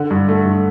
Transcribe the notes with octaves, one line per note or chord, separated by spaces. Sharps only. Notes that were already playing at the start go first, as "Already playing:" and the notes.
Already playing: D3
G2
A3
G2